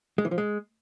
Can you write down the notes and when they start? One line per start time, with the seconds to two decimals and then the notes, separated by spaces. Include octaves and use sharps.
0.18 G#3
0.25 E3
0.31 F3
0.38 G#3